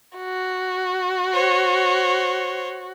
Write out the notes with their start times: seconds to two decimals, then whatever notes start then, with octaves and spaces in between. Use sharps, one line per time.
0.18 F#4
1.33 C5 C#5